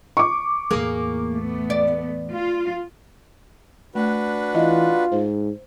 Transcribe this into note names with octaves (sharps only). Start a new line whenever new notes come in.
C#6 D6
E2 A2 A#3 G#4
A3 B3
D5
F4
A3 D4 F#4 B4
E3 F4 D#5
G#2 C5